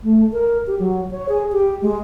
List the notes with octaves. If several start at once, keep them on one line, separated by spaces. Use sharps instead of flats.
A3
A#4
G4
F#3
C#5
G#4
G4
G#3